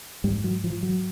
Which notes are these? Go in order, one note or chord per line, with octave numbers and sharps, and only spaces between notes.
G#2 G3
F#3
F3
F#3